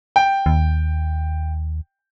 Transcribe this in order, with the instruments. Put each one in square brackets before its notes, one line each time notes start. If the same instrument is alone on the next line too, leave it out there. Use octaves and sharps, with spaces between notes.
[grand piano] G5
[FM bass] D#2